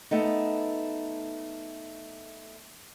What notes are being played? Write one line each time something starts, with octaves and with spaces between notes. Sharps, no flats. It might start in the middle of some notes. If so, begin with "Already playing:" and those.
A3 B3 D#4